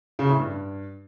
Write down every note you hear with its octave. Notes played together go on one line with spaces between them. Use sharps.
C#3
A2
G2